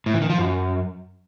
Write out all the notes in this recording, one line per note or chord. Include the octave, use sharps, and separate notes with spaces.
A2
E3
D#3
F3
F#2